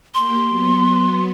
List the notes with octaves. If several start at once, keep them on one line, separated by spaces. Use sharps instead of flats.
A#3 G4 C6
F#3 B3